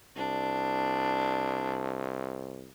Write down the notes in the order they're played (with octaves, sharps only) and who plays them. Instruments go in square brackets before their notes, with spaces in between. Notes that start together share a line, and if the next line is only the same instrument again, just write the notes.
[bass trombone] C2 [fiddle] D4